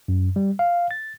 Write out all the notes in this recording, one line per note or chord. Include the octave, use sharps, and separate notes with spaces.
F#2
G3
F5
A6